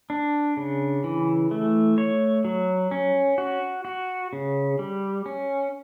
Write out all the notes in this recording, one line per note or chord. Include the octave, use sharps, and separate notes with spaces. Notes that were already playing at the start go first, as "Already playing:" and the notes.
D4
C#3
E3
A3
C#5
F#3
C#4
F#4
F#4
C#3
G3
C#4